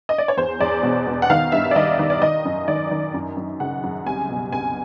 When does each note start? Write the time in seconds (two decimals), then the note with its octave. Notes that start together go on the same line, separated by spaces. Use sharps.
0.09 D#5
0.18 D5
0.28 C#5
0.37 E2 C5
0.60 E2 D5
0.83 B2
1.07 B2
1.22 F#5
1.30 D#3 F5
1.52 G2 E5
1.71 D5
1.76 D#3 D#5
1.99 D#3
2.10 D5
2.22 D#3 D#5
2.45 F#2
2.68 D#3 D5
2.91 D#3
3.14 F#2
3.37 F#2
3.60 C#3 F#5
3.83 F#2
4.06 C2 G#5
4.29 B2
4.53 C2 G#5